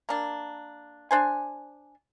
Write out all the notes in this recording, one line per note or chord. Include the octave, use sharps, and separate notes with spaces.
A#3 D4
D4 C5 G#5